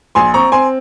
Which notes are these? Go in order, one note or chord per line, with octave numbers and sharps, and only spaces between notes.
A#1 G#5 C6
C4 A#5 C#6
C4 G#5 C6